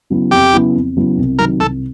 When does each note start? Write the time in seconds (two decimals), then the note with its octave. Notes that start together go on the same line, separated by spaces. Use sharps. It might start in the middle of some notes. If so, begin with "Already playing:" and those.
0.10 C#3 F#3 B3 E4
0.31 F2 G4
0.53 C#3 F#3 B3 E4
0.75 F2
0.97 C#3 F#3 B3 E4
1.18 C2
1.39 C3 D#3 F#3 A#4
1.60 C2 A4